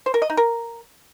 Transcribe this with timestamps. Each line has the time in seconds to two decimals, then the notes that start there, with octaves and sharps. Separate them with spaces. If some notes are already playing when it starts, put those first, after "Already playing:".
0.06 C5
0.14 A#4
0.22 D#5
0.30 D#4
0.37 A#4